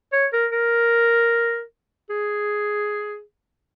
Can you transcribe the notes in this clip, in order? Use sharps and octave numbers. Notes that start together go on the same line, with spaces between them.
C#5
A#4
A#4
G#4